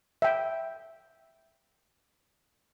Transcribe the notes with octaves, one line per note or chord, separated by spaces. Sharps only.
E5 G5